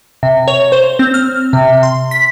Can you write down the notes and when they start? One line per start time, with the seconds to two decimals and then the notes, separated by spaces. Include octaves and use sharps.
0.23 C3
0.48 C#5
0.72 C5
0.99 C4
1.14 F6
1.53 C3
1.83 C6
2.11 B6